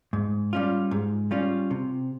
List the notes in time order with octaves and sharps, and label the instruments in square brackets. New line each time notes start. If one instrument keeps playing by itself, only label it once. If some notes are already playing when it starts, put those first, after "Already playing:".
[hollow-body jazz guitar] G#2
G3 C#4 F4
G#2
G3 C#4 F4
C3